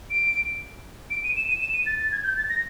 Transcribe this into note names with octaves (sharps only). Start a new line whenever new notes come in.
D7
D7
D#7
E7
D#7
E7
D#7
A6
A6
G#6
G6
A6
A#6